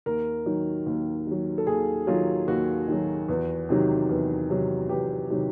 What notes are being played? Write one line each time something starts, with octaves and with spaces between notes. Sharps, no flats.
D#2 A#4
D#3 F#3
D#2
D#3 F#3
A4
D#2 G#4
D#3 F#3 F4
D#2 F#4
D#3 F#3
E2
C3 D#3 F#3
E2
C3 D#3 F#3
E2 G4
C3 D#3 F#3